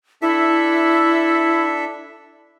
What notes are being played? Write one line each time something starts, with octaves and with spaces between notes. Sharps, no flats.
D4 E4 A4 E5